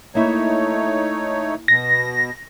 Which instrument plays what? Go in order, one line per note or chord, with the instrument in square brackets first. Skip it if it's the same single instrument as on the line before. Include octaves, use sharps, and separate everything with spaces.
[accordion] A3 D#4 C#5 [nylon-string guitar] A#3 E4
[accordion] B2 [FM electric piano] A#6